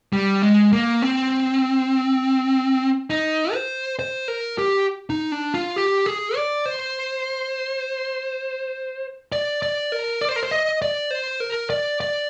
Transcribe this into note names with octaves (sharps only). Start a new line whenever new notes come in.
G3
G#3
A#3
C4
D#4
C5
C5
A#4
G4
D#4
D4
F4
G4
G#4
D5
C5
D5
D5
A#4
D5
C5
A#4
C5
D#5
D5
C5
A#4
D5
D5